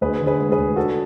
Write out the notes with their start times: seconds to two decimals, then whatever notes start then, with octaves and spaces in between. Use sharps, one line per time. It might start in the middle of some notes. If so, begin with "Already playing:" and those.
0.01 D2 G#4 B4
0.20 D3
0.27 G#4 B4
0.39 G#3
0.52 G#4 B4
0.58 D2
0.76 D4 F#4 A4